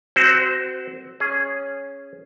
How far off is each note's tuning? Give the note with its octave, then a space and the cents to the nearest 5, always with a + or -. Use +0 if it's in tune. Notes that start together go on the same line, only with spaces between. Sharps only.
C4 +0 F#4 +20 C5 -30
C#4 +0 G#4 +0